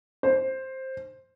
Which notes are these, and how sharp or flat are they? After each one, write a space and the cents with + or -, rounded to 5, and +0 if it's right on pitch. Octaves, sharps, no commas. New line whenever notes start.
C5 +10